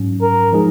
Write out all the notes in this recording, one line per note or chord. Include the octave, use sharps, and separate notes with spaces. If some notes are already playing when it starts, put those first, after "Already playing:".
Already playing: G#2 F#3 C#4
A#4
F3 G#3 D#4 G#4